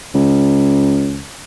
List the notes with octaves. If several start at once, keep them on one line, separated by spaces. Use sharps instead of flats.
C#2